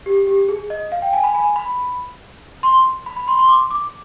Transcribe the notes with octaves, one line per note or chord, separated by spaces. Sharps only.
G4
G4
G#4
D#5
F5
G5
G#5
B5
G#5
B5
C6
B5
B5
C6
C6
D6
D6